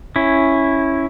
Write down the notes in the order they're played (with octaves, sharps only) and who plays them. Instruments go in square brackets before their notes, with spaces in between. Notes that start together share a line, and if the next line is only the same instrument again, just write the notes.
[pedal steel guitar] C#4 E4